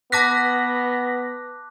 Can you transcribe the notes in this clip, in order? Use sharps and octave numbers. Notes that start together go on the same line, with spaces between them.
B3 A5 D6 F#6 A#6 B6